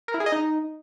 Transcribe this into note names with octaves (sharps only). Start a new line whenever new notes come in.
A#4
E4
G#4
D#5
D#4